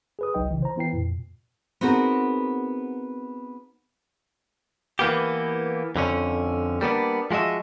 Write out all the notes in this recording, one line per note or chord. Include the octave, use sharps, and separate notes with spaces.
G#4 B4 D#6
G1 C2 F#3 D#4 D#5 G5
C#3 E3
C5 A#5
E3 B3 E4 B4 G5 C7
F2 A#2
B3 C4 D#4 F#4 G#4 A#4
E3 A#3 B3 G4
F2 D3 C#4
G3 A#3 B3 D4
F3 G#3 F#4 D#5 E5